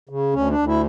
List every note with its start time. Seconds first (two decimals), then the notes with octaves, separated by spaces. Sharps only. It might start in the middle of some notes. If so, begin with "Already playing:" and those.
0.09 C#3
0.33 D2 C#4
0.50 D4
0.58 D2
0.67 E4